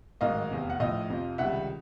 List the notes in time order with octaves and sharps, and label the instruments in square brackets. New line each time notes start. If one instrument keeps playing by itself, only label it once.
[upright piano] A1 G#2 D#3 F#3 A#3 D#5 F5
F1 E2 C3
F#5
A#1 A2 F3 D#5 F5
F2 C3 F3
C#2 C3 D#3 G3 E5 F#5